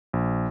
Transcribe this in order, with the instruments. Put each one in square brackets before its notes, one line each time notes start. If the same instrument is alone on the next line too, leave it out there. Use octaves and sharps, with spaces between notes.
[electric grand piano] A#1